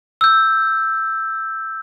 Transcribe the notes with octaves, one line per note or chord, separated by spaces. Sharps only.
E6 G6